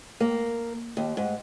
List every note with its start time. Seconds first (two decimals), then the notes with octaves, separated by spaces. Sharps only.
0.20 A#3
0.97 D#2
1.17 G#2